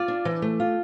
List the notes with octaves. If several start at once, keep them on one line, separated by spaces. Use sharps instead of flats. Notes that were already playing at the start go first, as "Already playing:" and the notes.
Already playing: F4 D5
D4
E3
A3
F4